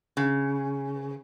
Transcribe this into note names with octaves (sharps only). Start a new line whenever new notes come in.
C#3